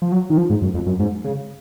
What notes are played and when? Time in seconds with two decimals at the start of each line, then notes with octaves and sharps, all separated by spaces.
0.02 F3
0.12 F#3
0.30 D#3
0.37 F3
0.50 G#2
0.62 F#2
0.74 F2
0.87 F#2
1.00 G#2
1.25 C#3